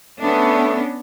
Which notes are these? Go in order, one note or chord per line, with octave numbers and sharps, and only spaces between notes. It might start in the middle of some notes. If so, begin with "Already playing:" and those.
A3 B3 C#4 D4